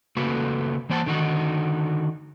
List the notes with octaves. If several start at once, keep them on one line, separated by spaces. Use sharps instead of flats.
C#3 A3 A#3 F#4 A4 B4
E3 A#3 C5 F#5 G#5 A5
D3 D#3 D#4 F#4